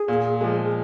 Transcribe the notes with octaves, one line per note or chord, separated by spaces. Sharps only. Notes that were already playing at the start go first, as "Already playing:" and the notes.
Already playing: G#4
A#2
F3 G#3
G#4